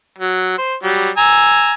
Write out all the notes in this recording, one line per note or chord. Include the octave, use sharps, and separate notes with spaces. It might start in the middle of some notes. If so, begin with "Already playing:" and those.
F#3
C5
F#3 G3
G#5 A#5 E6